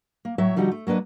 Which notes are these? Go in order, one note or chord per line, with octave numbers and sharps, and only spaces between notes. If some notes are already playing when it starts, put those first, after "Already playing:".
A#3
A2 F#3 C#5 E5
D3 F3 G3 D#4 F#4
A3
F#3 A#3 D4 B4 D#5